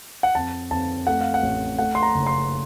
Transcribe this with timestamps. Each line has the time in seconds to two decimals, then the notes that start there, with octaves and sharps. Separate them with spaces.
0.23 F#5
0.35 F2 A5
0.71 F2 A5
1.07 A3 F#5
1.21 F5
1.34 F#5
1.43 A1
1.78 A3 F#5
1.95 C6
2.03 A#5
2.14 F#1
2.27 C6